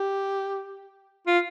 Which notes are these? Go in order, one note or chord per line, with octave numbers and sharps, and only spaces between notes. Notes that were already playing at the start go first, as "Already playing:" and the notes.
Already playing: G4
F4